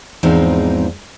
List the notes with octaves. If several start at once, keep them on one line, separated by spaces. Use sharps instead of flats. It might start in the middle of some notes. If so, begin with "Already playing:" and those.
E2 G#2 F3 C4 D#4